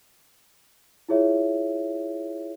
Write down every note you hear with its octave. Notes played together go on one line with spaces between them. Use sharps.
E4 F4 G#4 C#5 E5